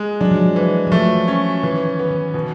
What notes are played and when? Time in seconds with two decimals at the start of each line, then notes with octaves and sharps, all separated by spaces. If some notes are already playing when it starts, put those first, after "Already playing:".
Already playing: G#3
0.21 F#3 D4
0.31 F3
0.41 F#3
0.56 E3
0.87 F#3
0.92 F3 A3
1.28 C#4
1.63 D#3 E3
1.99 B3
2.10 D#3
2.34 B2 D#3